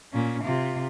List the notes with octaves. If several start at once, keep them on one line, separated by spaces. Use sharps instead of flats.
A#2 C#4
C3 F4